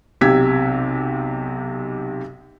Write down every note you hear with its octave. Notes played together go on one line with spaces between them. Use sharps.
B1 C3 G4 E6 G#6 B6